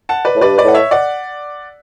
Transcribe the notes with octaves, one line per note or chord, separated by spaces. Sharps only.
F#5 A5
B4 D5
A2
G2 B4 D5
B4 D5
A2 F#5
C#5 E5
D5 F#5